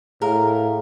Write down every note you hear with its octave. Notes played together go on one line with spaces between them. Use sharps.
A2 G#4 A#4 F5